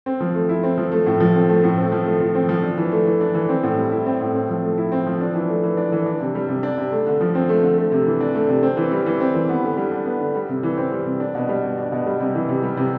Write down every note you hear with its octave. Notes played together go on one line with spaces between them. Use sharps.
C4
F3
A3
E4
C4
F3
A3
A2
F3
C4
A3
A2
C4
F3
A3
F3
C4
F3
D4
E3
A3
E3
D4
E3
C4
A2
G3
E4
C4
A2
C4
F3
A3
E4
C4
F3
D4
E3
A3
E3
D4
E3
D4
C3
G3
C3
D4
C3
A3
D3
F3
C4
A3
D3
A3
C3
E3
D4
A3
C3
C4
E3
G3
E3
C4
E3
B3
D3
G3
D4
B3
D3
G3
C3
E3
C4
G3
C3
D4
B2
G3
B2
D4
B2
G3
C3
E3
C3
G3
C3